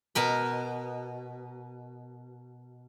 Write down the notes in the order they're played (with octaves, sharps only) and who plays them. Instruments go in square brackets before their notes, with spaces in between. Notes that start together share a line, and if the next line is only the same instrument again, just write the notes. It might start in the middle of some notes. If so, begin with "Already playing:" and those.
[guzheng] B2 A#4 B5